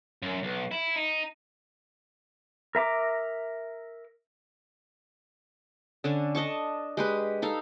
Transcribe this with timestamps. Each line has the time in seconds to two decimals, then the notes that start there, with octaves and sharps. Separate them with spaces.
0.22 F#2
0.43 B1
0.71 E4
0.96 D#4
2.75 A#4 E5 A#5 D6
6.04 D3 C#4 D4
6.35 D4 D#5 A5 C#6
6.97 G#3 G4 B4
7.42 D#4 A4 F5